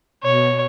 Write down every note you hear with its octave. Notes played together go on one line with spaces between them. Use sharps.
B2 C#5